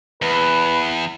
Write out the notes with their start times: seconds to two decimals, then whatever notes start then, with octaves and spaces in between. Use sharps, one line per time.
0.22 E2 B4